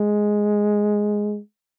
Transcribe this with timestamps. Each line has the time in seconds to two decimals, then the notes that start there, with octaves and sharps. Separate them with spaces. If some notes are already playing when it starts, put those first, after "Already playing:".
Already playing: G#3